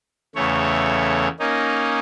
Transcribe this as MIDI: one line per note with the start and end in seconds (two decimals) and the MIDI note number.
0.35 1.28 40
0.35 1.28 49
0.35 1.28 57
0.35 1.28 73
1.40 2.00 58
1.40 2.00 61
1.40 2.00 63